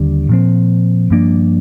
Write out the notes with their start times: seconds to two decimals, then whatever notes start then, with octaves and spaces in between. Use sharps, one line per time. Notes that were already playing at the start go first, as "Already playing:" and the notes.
Already playing: D#2 D3 G3
0.29 A#2 F3 C4
1.10 G2 F3 A#3 D4